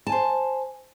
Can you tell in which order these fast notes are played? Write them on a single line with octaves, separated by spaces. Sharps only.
A5 G#5 C5